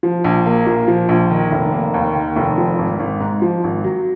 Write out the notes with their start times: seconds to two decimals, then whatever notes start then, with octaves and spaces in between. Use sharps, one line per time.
0.03 F3
0.24 A#1
0.46 A#3
0.66 A#2
0.88 F3
1.09 A#1
1.30 D#3
1.51 F1
1.73 A#3
1.94 D#2
2.15 D#3
2.36 F1
2.58 F3
2.78 G#1
2.99 G#1
3.20 G#2
3.42 F3
3.64 G#1
3.84 F#3